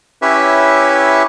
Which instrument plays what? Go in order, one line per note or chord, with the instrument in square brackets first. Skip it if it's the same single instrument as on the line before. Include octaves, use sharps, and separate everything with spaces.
[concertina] C#4 E4 G4 B4 C#5 E5